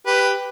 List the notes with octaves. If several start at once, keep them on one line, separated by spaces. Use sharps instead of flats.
G4 B4